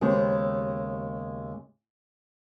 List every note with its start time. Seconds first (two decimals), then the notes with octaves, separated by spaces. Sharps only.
0.01 D#2 C#3 G#3 B3 G4 C5